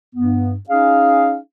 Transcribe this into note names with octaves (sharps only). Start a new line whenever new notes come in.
G2 B3
C#4 D#4 G#4 F5